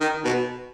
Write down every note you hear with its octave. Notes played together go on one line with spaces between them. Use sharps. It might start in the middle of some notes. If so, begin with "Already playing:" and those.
D#3
B2